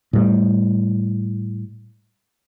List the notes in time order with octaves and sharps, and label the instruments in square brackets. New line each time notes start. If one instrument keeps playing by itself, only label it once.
[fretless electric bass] A2 G3